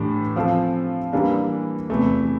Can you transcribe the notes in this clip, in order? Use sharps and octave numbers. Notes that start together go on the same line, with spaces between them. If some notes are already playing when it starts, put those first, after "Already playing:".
Already playing: A2 E3 A3 D4 G4
F3 C4 F4 A4
E3 G3 A#3 D4
E2 C3 E3 A3